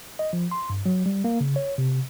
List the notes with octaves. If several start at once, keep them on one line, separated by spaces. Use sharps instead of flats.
D#5
F3
C6
G2
F#3
G3
A#3
C#3
C#5
C3